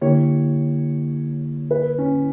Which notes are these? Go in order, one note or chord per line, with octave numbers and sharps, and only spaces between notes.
D3 A#3 E4 G4 C#5
B4
C#4